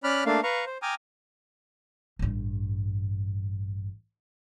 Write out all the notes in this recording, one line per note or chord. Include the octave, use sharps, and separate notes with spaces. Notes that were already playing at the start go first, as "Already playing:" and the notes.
C#4 D5 B5 F6 F#6
A3 A#3 D4 F5
B4 F5 A#5 C#6
C5
G5 G#5 A#5 D6 D#6 F6
A1 G2